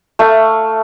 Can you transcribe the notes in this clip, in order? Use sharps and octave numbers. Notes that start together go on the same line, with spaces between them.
A3 F5